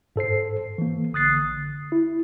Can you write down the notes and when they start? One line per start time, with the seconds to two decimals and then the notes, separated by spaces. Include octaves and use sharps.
0.16 G#2 A4 C5 C7
0.78 E3 A#3
1.13 A1 D3 D#6 F#6 A6 C7
1.92 E4